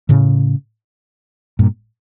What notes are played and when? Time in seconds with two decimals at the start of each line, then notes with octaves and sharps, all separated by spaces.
0.09 A2 C#3
1.59 G2 A#2